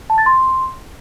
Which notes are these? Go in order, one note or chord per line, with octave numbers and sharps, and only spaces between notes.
A5
A6
C6